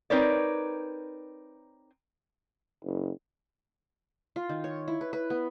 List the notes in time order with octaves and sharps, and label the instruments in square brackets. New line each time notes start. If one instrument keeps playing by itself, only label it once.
[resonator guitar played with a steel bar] C4 D#4 A#4 B4 C#5 D5
[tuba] F#1
[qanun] F4
D#3
C#5
E4
B4
B4
B3